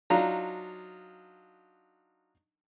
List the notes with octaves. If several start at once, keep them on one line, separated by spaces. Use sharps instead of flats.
F#3 D4 D#4 F4 A#5